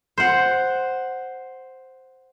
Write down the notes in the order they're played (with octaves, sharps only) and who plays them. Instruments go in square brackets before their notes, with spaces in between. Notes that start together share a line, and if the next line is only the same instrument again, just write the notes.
[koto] C5 F#5